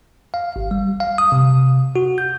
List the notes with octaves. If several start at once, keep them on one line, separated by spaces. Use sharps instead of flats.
F5
G#1
G3
F5
D#6
C3
F#4
G6